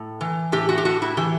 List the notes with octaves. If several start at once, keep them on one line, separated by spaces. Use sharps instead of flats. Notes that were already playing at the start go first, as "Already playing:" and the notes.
Already playing: A2
E3
A2 G4
F#4
G4
A2 F#4
E4
E3 G4